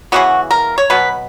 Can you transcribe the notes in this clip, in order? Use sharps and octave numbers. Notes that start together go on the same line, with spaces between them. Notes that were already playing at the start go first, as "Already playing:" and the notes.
C#3 E3 B3 F#4
A#4
C#5
B2 F#3 B3 B4